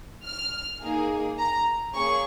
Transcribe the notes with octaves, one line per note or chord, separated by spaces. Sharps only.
F6
A#3 D#4 G#4
A#5
A#3 C#4 G#4 C#6